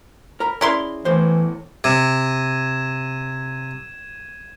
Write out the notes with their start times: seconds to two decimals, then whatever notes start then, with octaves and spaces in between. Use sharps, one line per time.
0.40 A#4 A#5 B5
0.61 C#4 E4 G#4 D5 A#5 C6
1.05 E2 A2 E3 C5
1.84 C3 G#6 D#7 E7